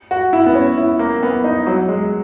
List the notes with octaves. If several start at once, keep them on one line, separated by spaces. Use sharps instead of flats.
F#4
E4
B3
C#4
E4
A#3
B3
D#4
F#3
G#3